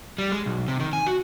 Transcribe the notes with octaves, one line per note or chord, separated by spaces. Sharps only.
G3
G#3
B1
C3
D#3
G#5
F#4